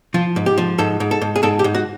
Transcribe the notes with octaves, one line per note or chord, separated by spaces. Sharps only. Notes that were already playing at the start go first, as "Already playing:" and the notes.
F3 F4
G#2
G4
F3
G#2 A4
G#2
A4
G#2
G#4
G#2 A4
G4
G#2
F#4